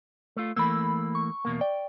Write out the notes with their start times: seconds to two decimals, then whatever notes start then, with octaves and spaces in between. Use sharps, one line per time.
0.37 A3 F4
0.56 E3 A3 A#3 B5 E6
1.15 C#6
1.45 E2 B2 A#3
1.61 D5 G5